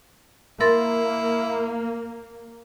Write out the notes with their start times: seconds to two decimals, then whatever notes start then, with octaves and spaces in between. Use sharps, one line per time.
0.61 A#3 E4 A#4 C6 A6